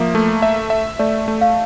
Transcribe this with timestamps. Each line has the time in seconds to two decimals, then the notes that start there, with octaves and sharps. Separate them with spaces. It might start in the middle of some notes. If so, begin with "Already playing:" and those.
Already playing: F3 A#3 E5
0.15 A3
0.42 E5
0.70 E5
0.99 A3 D5
1.28 A3
1.41 F5